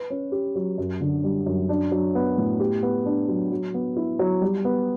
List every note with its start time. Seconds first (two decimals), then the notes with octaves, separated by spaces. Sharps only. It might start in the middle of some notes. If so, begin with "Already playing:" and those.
Already playing: B4
0.10 C#4
0.32 G4
0.55 F#3
0.78 F#2
1.01 D3
1.23 G3
1.46 F#2
1.69 D4
1.92 F#3
2.15 B3
2.38 A2
2.60 G4
2.83 B3
3.05 D4
3.28 F#3
3.51 F#3
3.74 B3
3.96 E4
4.19 F#3
4.41 G3
4.65 B3